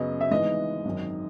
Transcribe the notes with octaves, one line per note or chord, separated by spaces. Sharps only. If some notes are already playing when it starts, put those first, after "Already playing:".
Already playing: F#2 C#3 F#3 B3 D#5
E5
G#1 G#2 E3 B3 D#5
G#1 F#2 D#3